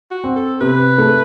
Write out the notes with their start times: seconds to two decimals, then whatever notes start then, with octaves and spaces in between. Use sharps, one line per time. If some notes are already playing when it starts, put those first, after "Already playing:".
0.11 F#4
0.24 C4
0.36 A4
0.61 C3 B4
0.98 A3